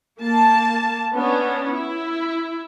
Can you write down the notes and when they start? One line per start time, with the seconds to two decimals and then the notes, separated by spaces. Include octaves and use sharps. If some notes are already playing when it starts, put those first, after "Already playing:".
0.20 A#3 A5
1.14 B3 C#4 D4
1.71 E4